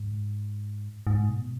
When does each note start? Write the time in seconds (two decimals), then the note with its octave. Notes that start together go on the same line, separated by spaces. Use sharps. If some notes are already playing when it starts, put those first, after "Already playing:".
Already playing: G#2
1.07 G#2
1.29 B2